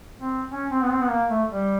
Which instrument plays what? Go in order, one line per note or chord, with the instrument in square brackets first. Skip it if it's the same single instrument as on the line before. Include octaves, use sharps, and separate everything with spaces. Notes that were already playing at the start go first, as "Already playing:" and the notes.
[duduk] C4
C#4
C4
B3
C4
B3
A#3
A3
G3